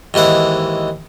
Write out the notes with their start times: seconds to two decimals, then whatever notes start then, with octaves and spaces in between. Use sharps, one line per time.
0.14 D#2 G#2 E3 F#5